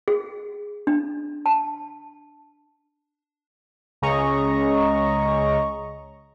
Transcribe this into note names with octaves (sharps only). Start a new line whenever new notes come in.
G#4
D4
A5
C#2 C#3 C#4 D#5 A#5 C#6